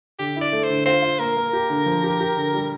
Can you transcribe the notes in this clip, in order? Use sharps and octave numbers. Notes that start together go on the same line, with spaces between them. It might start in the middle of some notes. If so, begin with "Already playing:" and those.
D3 G4
E4
D5
A3
C5
D3
F4 C5
F4
A#3 A#4
A#3
G4
D3
F3
G4
G4
D3
G3